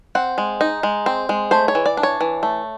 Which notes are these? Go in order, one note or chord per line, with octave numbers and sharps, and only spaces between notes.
C4 F#5
G#3
D#4
G#3
C4
G#3
A3 C5
C#5
E3
D5
D4
C#5
E3
A3